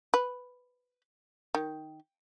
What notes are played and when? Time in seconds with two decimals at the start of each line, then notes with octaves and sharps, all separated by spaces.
0.14 B4
1.55 D#3